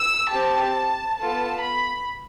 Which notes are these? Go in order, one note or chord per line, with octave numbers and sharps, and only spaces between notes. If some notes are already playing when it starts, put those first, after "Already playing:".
Already playing: E6
C4 G4 A5
B3 F4 A4 A5
B5